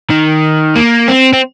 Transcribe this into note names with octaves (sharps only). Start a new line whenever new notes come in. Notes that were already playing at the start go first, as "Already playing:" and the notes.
D#3
A#3
C4
C4